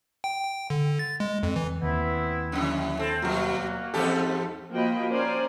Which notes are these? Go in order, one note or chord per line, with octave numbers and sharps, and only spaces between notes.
G5
G5
D3
A6
G#3
F2
E3
D#2 B3 C4 E4
F2 D3 E3
C4 A4
B2 F#3 G3 A#3 F#4
E2 G#2 C4 G4 A4
F3 A#3 F#4 D#5 G5 B5
C#4 A#4 C5 D5 G#5